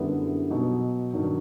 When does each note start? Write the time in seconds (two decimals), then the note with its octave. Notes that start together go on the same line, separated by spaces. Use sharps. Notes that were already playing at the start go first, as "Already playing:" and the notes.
Already playing: F#2 D3 G3 B3 E4
0.50 B2 F#3 B3 D#4
1.13 G2 D#3 F#3